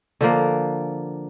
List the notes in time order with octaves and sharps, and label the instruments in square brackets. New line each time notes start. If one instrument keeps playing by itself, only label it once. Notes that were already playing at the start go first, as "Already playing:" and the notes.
[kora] D3 F3 A#3